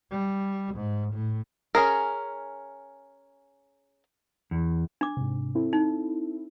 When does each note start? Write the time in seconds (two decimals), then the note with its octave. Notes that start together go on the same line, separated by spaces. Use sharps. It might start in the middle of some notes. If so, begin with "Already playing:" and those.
0.12 G3
0.75 G#2
1.13 A2
1.75 C#4 G#4 A#4
4.51 E2
5.01 D4 D6
5.17 G#2 C3
5.55 C4 E4 A4
5.73 D#4